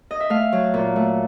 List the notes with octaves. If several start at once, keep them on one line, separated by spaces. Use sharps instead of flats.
D#5
E5
A3 F5
F#3
A#2
A3